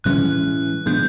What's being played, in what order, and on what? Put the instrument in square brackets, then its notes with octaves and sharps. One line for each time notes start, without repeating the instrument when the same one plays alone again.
[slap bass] A2 E3 G#3 C#4 [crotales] F#6
[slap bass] E3 G#3 B3 D4 [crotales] G6